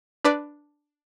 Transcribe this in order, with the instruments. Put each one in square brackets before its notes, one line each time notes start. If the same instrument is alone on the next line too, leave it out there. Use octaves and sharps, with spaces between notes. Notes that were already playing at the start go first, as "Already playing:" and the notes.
[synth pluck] D4 B4 D5